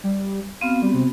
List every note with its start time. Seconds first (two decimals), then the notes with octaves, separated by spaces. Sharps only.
0.04 G3
0.61 B3 C4 F#4 F5
0.82 G3
0.94 C3